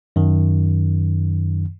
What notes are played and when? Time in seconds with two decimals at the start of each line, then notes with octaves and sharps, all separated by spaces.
0.16 F#2 D#3